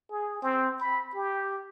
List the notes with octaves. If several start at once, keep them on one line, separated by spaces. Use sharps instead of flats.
G#4
C4
B5
G4